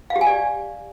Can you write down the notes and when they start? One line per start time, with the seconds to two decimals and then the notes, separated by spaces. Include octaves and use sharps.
0.10 F5
0.16 G4
0.21 G#5
0.26 D5